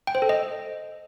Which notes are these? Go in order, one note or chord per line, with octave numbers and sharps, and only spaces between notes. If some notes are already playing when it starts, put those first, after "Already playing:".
G5
C5
A4
D#5